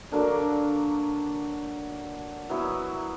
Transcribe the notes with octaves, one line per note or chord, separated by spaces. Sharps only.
D3 F#3 A#3 D4
F#3 B3 E4